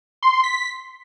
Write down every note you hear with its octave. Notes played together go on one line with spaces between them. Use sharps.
C6
C6
B6